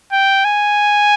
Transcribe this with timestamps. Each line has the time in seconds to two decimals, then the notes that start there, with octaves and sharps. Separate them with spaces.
0.12 G5
0.45 G#5